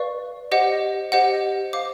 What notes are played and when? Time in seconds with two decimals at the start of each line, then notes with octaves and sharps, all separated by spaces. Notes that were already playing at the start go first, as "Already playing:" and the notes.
Already playing: B4 D5 F5 C#6
0.52 G4 C5 D#5 F#5
1.12 G4 C5 D#5 F#5
1.73 C5 F5 D6